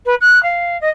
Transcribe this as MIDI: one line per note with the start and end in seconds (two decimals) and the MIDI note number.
0.05 0.14 71
0.20 0.41 90
0.42 0.79 77
0.81 0.89 75